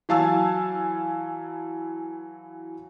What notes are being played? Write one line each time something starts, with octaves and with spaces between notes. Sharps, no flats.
E3 F#3 F5 G#5 A5 E6